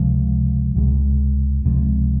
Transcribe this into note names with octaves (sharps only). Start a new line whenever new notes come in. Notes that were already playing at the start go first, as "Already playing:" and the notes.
Already playing: C#2 C3 F3 G#3
C#2 C3 F3 G#3
C#2 C3 F3 G#3